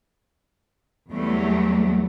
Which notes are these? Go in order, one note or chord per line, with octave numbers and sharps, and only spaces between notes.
E2 F#3 G3 A3